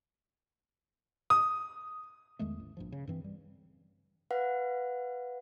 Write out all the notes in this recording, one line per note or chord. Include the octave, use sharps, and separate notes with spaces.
D#6
E2 D#3 G#3 A3
A1
A#1 G2 F3
C#3
G2 E3 C4
G3
B4 F5 F#5